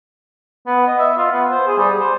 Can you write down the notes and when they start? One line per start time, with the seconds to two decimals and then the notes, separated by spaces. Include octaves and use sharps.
0.66 B3
0.87 D#5
0.99 E5
1.17 F4
1.31 B3
1.51 C5
1.67 G#4
1.78 G3
2.00 C5